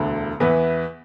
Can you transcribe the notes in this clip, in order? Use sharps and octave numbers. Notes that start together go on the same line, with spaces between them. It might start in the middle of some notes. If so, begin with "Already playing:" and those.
Already playing: E1 D2 D3
E2 E3 B3 E4 B4